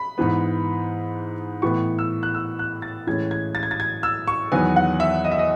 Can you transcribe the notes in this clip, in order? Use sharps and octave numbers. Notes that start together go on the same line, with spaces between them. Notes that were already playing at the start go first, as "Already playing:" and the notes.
Already playing: B5
G#2 E3 B3
A2 E3 B3 C#6
E6
F#6
E6
F#6
A6
A2 E3 G#3 C#4 G#6
G#6
A6
G#6
A6
G#6
E6
C#6
E2 D#3 F#3 B3 G#5
F#5
E5
D#5
E5
D#5